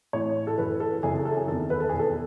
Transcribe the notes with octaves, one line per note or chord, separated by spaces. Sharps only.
A2 E3 C#5
A4
F#2 E3 B4
A4
F#2 C#3 E3 G#4
A4
A4
G#4
E2 D#3 A4
B4
A4
E2 B2 G#4
A4